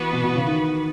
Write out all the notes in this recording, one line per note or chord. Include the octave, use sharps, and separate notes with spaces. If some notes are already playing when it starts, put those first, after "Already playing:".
Already playing: E3 B3 F#4 B4
B2
B2
C#3
D#3